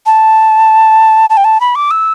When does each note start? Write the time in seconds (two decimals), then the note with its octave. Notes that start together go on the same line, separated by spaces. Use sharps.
0.06 A5
1.30 A5
1.37 G5
1.44 A5
1.60 B5
1.75 D6
1.91 E6